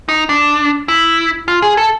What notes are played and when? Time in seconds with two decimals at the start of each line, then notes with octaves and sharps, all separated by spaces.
0.09 D#4
0.29 D4
0.88 E4
1.48 F4
1.62 G#4
1.77 A4